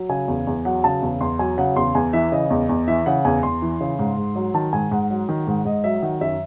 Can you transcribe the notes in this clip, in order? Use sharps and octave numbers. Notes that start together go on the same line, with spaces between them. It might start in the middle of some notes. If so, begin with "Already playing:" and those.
Already playing: F#3
C#3 G#5
E2
E2
F#3 F#5
C#3 A5
E2
E2 C6
F#3 G#5
C#3 F#5
E2 C6
E2 G#5
E3 E5
C#3 D#5
E2
E2
E3 E5
C#3 F#5
E2 G#5
E2 C6
E3
C#3
G#2
G#2
F#3
D#3 A5
G#2 G#5
G#2 F#5
F#3
D#3
G#2
G#2 D#5
F#3 E5
D#3 F#5
F#2 E5